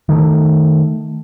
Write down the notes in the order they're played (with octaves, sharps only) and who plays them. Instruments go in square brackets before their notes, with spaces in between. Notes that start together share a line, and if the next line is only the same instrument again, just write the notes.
[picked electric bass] D#3 A3